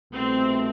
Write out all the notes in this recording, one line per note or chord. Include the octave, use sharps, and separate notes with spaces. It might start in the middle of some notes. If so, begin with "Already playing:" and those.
C2 B2 A3 C4